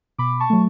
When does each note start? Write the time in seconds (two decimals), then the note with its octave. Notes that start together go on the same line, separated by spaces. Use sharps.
0.19 B2 B5 D6
0.40 A5 C#6
0.50 F#3 A3